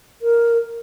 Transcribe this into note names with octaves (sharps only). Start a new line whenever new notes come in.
A#4